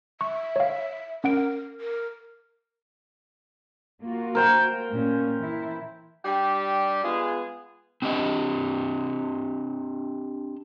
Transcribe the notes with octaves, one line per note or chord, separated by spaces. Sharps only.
E5 C#6
C#5 F5
C#4 A#4 F#5 D7
A#4
A#3 F4 F#4
A#4 C5 G5
A#2 C#4
E3 E4
G3 D4 G4
G#3 B3 F4 G#4
C4 D4 G4 D#5